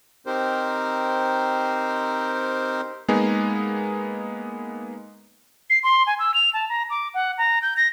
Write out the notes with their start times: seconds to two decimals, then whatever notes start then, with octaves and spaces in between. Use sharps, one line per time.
0.27 C4 D#4 G4 A#4 C5
3.08 G#3 A#3 B3 D#4 G#4
5.70 C7
5.83 C6
6.07 G#5
6.19 E6
6.34 F7
6.54 A5
6.69 A#5
6.90 D6
7.14 F#5
7.38 A#5
7.62 G6
7.77 A#6